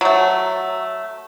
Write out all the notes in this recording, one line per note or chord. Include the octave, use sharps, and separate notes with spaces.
F#3 A3